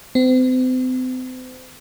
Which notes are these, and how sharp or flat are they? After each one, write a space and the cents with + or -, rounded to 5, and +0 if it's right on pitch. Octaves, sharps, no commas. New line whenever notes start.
C4 -40